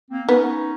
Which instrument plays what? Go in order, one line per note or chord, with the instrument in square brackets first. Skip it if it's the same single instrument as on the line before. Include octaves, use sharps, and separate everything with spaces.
[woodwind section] A#3 C4
[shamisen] B3 [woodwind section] C#4 D#4